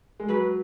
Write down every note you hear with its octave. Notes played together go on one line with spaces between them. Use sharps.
G#3
F#3 B4